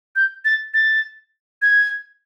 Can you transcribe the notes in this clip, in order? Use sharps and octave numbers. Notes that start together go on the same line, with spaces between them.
G6
A6
A6
G#6